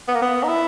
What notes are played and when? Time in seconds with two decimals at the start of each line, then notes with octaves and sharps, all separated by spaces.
0.08 B3
0.15 A#3
0.22 B3
0.43 D#4
0.49 E4